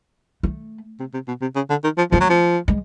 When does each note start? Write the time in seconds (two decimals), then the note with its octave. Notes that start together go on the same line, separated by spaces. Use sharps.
0.43 A3
1.00 C3
1.14 C3
1.28 B2
1.41 C3
1.56 C#3
1.70 D3
1.84 D#3
1.98 F3
2.12 F3 A3
2.20 F#3
2.29 F3
2.68 G#3